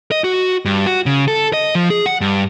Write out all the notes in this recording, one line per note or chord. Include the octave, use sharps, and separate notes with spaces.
D#5
F#4
G2
F#4
C#3
A4
D#5
F3
G#4
F#5
G2